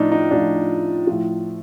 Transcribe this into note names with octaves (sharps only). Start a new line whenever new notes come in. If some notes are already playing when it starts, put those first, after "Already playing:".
Already playing: A2 F3 D4 D#4
D#4
A2 F3 D4
A2 F3